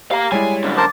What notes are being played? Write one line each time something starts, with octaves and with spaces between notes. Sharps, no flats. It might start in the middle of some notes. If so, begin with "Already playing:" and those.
G4 F5 A#5 C7
G3 G#3 E4 C#5 G#5
F#2 D3
A#4 C5 A5 D6 A6